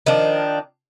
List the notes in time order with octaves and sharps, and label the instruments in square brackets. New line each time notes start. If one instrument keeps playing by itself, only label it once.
[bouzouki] D#3 F3 D4